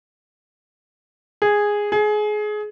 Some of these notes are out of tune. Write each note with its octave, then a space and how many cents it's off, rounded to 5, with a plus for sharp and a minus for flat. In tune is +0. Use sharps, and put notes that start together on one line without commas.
G#4 -5
G#4 +25